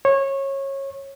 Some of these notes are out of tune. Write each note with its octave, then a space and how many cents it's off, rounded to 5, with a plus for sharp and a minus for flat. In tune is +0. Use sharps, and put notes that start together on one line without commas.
C#5 -20